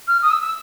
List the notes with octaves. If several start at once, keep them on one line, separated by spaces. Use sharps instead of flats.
F6
D#6
E6
E6